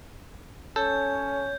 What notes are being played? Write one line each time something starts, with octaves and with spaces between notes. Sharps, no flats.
C#4 A4 C#5 G6